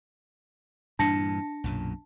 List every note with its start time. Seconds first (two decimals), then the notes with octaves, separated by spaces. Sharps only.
0.99 G2 A#2 E3 D4 A5 A#6 C#7
1.64 B1 F#2 A#2